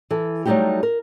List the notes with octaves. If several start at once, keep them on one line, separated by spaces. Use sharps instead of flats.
E3 A4
F#3 G3 A3 D#4 F#4 G4
A#4